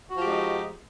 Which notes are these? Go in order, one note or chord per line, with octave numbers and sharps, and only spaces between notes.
F3 G#3 D#4 F#4 G4